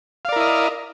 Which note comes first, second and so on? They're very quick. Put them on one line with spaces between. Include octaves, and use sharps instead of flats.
F5 D5 A#4 E4 D#5